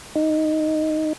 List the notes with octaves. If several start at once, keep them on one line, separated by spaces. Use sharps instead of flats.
D#4